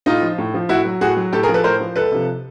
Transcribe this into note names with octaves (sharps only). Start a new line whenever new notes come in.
A2 D#4 F4
F3
A2
F3
A2 E4 F#4
F#3
A2 F#4 G#4
F#3
A2 G4 A4
G#4 A#4
F3
A4 B4
A2 A#4 C5
F3
C#2 A4 B4
C3 F3